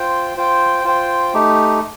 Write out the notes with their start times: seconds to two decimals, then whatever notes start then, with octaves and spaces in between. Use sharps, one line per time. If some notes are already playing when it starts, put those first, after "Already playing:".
Already playing: F4 C5 G5
0.37 F4 C5 G5
0.85 F4 C5 G5
1.34 A3 D#4 G4